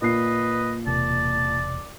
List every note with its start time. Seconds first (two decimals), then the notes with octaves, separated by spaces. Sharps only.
0.02 A#2 B4 D#5 C7
0.87 E1 C3 A#3 D5 A5